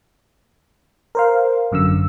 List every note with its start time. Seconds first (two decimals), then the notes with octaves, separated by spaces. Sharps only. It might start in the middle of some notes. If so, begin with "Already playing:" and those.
1.15 A#4 C5 F5
1.71 G#1 F#2 D3 E6